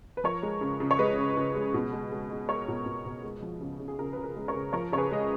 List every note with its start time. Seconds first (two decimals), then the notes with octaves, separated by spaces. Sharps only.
0.17 B4
0.24 F3 A#4 C#5
0.43 G#3
0.61 C#3
0.80 C#3
0.91 C#5
0.99 G#3 B4 D#5
1.18 C#3
1.37 C#3
1.56 G#3
1.74 B2
1.93 G#3
2.12 G#3
2.30 G#3
2.48 G#3 A#4 C#5
2.68 B2
2.86 B2
3.06 B2
3.24 G#3
3.42 F3
3.61 C#3
3.80 C#3
3.88 G#4
3.99 C#3 A#4
4.13 C#3 B4
4.24 A#4
4.36 G#3
4.48 A#4 C#5
4.54 C#3
4.73 F3 A#4 C#5
4.92 C#3 C#5
4.98 G#4 B4
5.11 G#3 D#5